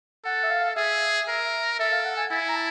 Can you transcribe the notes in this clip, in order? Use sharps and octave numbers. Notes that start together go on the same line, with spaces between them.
A4 F#5
E5
F5
G#4 E5
A#4
A4 E5
F5
F#5
G#5
E4 G#5
A#5
A5